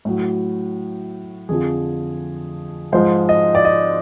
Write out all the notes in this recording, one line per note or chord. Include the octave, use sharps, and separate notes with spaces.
A2 F#3
F2 D3 F3 G#4
G#2 F3 G#3 C5
D#5
D5
D#5